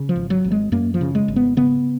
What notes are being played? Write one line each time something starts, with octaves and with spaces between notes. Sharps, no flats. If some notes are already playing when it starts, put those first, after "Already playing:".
Already playing: C#3
F3
G#1
F#3
G#1
G#3
F#2 A#3
F3
C#3
G#3
G#1
B3
C#3 B3